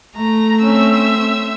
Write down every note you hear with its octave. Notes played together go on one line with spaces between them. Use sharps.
A3 A#5
C4 C#4 E5 E6